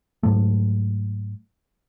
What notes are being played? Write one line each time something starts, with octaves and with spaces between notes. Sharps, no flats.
G#2 F#3 A3